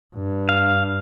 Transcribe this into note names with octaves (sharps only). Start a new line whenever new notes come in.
G2
F5